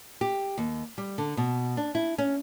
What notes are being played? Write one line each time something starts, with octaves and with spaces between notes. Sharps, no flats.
G4
D#2
G3
D3
B2
D4
E4
C#4